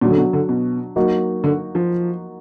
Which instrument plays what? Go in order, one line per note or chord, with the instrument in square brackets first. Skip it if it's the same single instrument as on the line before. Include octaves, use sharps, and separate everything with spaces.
[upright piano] A#2 [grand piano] F#3 D4 F#4
[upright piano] D3
B2
D3
B2
[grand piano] F#3 A#3 D#4 F#4
[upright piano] D3
F3